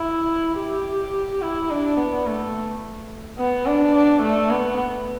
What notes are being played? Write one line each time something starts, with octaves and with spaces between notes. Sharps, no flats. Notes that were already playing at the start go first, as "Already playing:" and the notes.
Already playing: E4
G4
E4
D4
B3
A3
B3
D4
D4
A3
B3